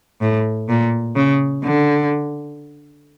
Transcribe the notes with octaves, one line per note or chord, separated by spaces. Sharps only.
A2
A#2
C#3
D3